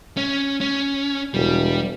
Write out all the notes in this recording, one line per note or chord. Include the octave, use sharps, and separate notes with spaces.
C#4
C#4
E1 G3